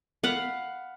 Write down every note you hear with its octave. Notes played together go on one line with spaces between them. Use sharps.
F5 F#5 B5